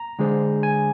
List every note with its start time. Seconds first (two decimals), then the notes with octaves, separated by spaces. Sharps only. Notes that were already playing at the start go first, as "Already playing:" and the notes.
Already playing: A#5
0.19 D3 G#3 D4 G#4 C5
0.63 G#5